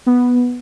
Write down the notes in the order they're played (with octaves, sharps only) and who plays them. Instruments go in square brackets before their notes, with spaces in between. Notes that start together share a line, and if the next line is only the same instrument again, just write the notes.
[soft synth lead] B3